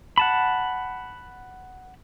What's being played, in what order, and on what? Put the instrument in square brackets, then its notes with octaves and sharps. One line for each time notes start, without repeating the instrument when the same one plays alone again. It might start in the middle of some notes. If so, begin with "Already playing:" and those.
[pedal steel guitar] F#5 A5 B5